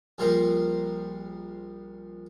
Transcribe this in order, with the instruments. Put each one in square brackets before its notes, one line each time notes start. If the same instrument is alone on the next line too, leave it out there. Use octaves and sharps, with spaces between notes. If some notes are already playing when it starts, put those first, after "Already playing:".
[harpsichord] A#1 A#2 G3 F4 A#4 C5